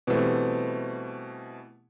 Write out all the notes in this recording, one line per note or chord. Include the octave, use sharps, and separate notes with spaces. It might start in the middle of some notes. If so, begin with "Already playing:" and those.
B2 E3 G3 A3 C4